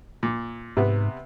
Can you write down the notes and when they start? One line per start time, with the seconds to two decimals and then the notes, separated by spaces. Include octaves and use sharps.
0.23 A#2
0.77 G#2 C3 B3